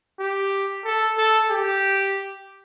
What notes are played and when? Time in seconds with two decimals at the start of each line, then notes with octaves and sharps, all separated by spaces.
0.20 G4
0.85 A4
1.18 A4
1.50 G4